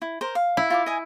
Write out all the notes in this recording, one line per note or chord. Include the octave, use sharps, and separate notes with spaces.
E4
A#4 C5
F5
E4
F4 G#5 D6
D#5 G#5